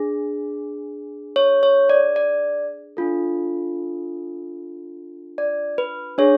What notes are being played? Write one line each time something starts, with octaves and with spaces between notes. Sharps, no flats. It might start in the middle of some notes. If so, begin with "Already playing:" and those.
Already playing: D4 G#4
C#5
C#5
D5
D5
D4 F4 A4
D5
B4
D4 G#4 C#5